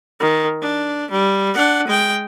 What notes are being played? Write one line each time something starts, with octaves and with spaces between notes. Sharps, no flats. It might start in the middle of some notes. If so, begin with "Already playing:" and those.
D#3
D4
G3
D4 F#5
G#3 G5